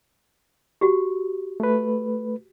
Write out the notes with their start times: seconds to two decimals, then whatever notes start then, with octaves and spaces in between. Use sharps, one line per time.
0.81 F#4 G4
1.60 A3 B4